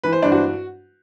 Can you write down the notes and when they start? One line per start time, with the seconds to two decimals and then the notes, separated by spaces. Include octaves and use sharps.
0.03 E3 B4
0.13 C5
0.23 G2 D4
0.32 F#4